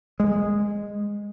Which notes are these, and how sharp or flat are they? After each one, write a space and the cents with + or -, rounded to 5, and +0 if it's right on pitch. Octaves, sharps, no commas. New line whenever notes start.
G#3 -10